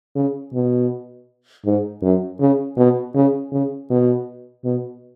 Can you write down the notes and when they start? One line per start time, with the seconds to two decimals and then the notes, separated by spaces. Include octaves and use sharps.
0.16 C#3
0.54 B2
1.66 G#2
2.02 F#2
2.40 C#3
2.77 B2
3.15 C#3
3.52 C#3
3.90 B2
4.65 B2